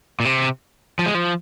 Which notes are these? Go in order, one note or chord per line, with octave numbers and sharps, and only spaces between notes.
A#2
C3
F3
G#3
F3